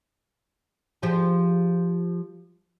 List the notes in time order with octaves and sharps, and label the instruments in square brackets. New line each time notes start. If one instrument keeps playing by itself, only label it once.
[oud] F3 G4 G#4